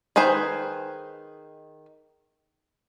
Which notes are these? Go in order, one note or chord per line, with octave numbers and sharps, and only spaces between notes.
D#3 G#4 B4 C5